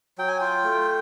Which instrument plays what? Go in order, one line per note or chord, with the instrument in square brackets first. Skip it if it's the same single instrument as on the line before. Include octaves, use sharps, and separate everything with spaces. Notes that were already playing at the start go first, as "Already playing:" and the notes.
[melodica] F#3 G5
G#5
F4 G5
A3